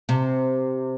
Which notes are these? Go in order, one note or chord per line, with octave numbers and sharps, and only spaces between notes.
C3